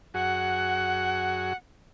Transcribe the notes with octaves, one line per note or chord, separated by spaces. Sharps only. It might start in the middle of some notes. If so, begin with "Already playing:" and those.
F#2 F#4 G#4 F#5